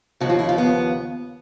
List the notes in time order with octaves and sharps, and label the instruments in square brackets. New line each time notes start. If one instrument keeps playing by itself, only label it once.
[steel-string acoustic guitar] D#2 C#3 F3 F#4
F4
E4
F4
B3